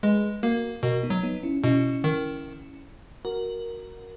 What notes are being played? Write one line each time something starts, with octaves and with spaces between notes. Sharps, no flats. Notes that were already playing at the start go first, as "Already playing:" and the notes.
G#3 G#4 B4
A#3 F#4 A#4
B2 F#4 A#4
B3 D#4
F#3
B3 D#4
C#4 E4
B2 C#4 E4
D#3
F#4 A#4